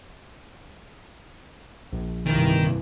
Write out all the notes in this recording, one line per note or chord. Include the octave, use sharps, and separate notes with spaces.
A#1
C2 G2 D#3 E3